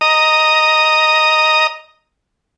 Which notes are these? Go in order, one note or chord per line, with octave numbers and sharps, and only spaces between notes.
D#5 A#5 D#6